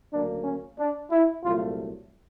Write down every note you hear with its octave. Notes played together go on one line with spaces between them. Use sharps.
D2 C#3 F#3 A#3 D4
C#4
D4
E4
C2 A#2 F#3 A3 F4